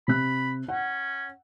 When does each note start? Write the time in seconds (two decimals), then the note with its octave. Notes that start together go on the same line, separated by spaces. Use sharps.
0.08 C3 B5 F#6
0.68 C#4 F#5